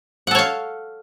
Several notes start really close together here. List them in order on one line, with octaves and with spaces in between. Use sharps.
F#5 A4 C#5 F5